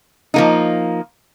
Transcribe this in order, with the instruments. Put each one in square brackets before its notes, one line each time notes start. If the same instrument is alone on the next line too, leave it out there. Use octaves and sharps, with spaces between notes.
[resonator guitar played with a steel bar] F3 A#3 D#4